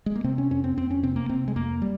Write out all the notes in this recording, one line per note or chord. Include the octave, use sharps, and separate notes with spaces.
G#3
A#3
C3 C4
C#4
F2 C#4
C4
F2 C4
C#4
C3 C4
A#3
C3 C4
G#3
F2 A#3
G3